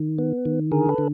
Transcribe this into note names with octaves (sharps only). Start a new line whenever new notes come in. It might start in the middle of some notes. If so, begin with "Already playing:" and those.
Already playing: D#3
B3
D#3
D3 G#4 A#4
A4 B4
D3